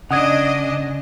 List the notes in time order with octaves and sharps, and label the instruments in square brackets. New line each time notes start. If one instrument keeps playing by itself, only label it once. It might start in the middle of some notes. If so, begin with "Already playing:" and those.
[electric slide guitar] C#3 [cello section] D4 D#5 [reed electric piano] F#5 D#6 G#6